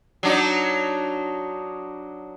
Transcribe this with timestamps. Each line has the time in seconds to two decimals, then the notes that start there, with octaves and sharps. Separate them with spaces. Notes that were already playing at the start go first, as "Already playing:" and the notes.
0.23 F#3 D4 D#4